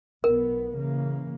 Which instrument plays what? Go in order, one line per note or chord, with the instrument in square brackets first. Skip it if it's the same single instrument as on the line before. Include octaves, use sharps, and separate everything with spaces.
[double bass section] B1 B3 [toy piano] A#4
[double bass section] C#3 E3 A#3